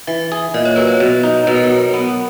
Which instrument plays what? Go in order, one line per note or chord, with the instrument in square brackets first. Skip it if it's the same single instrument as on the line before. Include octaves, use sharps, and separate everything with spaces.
[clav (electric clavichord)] E3 [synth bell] E5
[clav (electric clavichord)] G#4
[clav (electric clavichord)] A#2 [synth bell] D#5
[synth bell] C#5
[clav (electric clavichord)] F#3 [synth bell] B4
[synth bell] C#5
[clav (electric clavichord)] B2
D#4
[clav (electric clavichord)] B2 [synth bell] B4
[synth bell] A#4
B4
[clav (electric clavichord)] F#3
B3